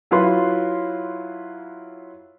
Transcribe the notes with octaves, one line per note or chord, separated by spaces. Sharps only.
F#3 E4 F4 B4 C6